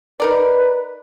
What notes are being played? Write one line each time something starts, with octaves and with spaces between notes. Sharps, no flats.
D#4 A#4 B4 D5